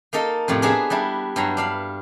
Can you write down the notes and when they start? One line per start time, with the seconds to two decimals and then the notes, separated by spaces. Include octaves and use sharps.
0.13 A#3 D#4 A4 D#5
0.48 F2 A2 C3
0.62 B3 D4 G#4 B4 E5 A#5
0.90 G3 D4 E4
1.36 G2 F#3 A#5
1.57 D4 F5 B5